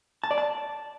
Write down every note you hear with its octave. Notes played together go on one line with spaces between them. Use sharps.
A5
D5
A5